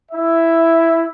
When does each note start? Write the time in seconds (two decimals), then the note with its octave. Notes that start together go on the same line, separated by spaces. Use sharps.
0.12 E4 E5